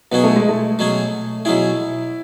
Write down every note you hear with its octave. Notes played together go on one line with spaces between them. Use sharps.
B2 F#3 B3 C#4 G#4
A3
G#3
A3
B2 F#3 C#4 G#4
B2 F#3 C#4 E4 G#4